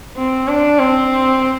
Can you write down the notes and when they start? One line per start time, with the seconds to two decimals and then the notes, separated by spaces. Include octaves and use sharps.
0.17 C4
0.48 D4
0.79 C4